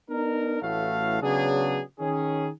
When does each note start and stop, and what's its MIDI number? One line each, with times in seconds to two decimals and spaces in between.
0.10 0.61 59
0.10 0.61 62
0.10 0.61 63
0.10 0.61 70
0.61 1.18 33
0.61 1.18 45
0.61 1.18 52
0.61 1.18 57
0.61 1.18 66
0.61 1.18 77
1.22 1.81 49
1.22 1.81 54
1.22 1.81 59
1.22 1.81 62
1.22 1.81 68
2.00 2.48 51
2.00 2.48 61
2.00 2.48 68